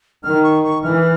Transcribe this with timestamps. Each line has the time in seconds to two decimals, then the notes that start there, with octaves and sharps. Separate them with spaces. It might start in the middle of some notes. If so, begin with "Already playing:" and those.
0.24 D#3 F6
0.43 C#6
0.64 C#6
0.83 E3 F6